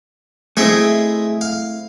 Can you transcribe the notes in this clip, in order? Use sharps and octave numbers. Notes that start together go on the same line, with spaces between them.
A3 C4 E4 G#4 D#5 E5
F5